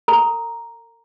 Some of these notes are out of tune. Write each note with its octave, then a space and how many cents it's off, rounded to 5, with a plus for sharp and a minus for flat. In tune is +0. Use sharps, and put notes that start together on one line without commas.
A#4 -45 A#5 +0